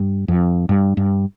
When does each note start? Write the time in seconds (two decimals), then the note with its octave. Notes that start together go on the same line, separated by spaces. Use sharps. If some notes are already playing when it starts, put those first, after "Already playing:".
Already playing: G2
0.28 F2
0.69 G2
0.97 G2